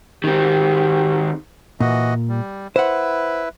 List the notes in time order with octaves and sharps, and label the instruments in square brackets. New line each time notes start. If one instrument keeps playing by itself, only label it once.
[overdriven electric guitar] D#3 C4 [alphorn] G4
[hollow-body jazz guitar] A#2 [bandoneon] E3 F#4 D#5
[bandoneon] G3
[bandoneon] E4 B4 [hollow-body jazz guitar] C5 F#5